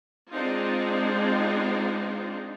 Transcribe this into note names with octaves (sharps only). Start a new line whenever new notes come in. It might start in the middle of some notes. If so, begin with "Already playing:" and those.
G#3 C4 D4 D#4 F4